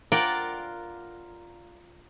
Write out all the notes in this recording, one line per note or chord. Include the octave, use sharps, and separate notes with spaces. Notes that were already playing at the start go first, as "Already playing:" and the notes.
F4 A#4 D5 F#5 G5